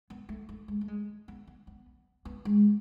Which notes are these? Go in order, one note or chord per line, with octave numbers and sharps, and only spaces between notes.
B3
A3
A3
G#3
A3
G#3
B3
B3
B3
B3
G#3